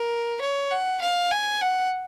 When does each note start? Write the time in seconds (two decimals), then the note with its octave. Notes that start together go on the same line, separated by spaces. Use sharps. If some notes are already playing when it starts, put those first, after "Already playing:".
Already playing: A#4
0.41 C#5
0.71 F#5
1.01 F5
1.31 G#5
1.61 F#5